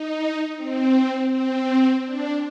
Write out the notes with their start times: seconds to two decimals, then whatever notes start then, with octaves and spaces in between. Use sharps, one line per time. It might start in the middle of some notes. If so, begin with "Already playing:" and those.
Already playing: D#4
0.57 C4
1.32 C4
2.05 D4